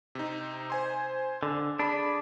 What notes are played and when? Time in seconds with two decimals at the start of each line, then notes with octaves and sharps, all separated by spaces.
0.15 C3 D#4
0.70 C5 G#5 C6
1.43 D3
1.79 D4 G#4 B5